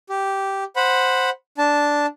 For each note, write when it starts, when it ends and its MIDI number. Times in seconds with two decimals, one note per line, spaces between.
0.10 0.64 67
0.76 1.30 72
0.76 1.30 78
0.76 1.30 83
1.58 2.06 62
1.58 2.06 81